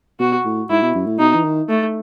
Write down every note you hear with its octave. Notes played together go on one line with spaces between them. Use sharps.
B2 F#4
A2
G#2 E4
B2
F#2
A2
B2 D#4
E3
D#3
A3